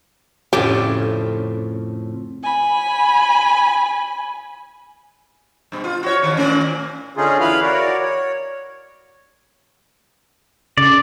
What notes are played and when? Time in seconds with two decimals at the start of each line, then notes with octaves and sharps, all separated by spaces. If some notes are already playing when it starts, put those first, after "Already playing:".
0.53 F2 A2 C#3 G4
2.43 G#5 B5
5.72 G2 B2
5.84 F4
6.03 F#4 C#5
6.22 F2 D#3
6.37 A#2 A3 C#4
7.15 D3 A3 C#4 D#4 F4 G#4
7.41 E3 E4 B4 F5 B5 F6
7.62 F#4 A#4 C#5 D5
8.01 C#5
10.78 C#3 D5